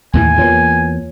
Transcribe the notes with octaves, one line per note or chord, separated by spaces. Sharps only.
D#2 A2 E3 G#5
E2 E3 A#3 F4 C#5